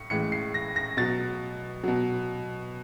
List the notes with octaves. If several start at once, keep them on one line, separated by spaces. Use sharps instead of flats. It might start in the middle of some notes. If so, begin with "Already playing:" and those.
Already playing: A2 C#7
A2 E3 G#3 C#7
C7
A#6
A#6
B2 F#3 A6
B2 F#3